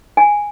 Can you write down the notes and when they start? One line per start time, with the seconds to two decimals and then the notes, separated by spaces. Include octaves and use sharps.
0.17 G#5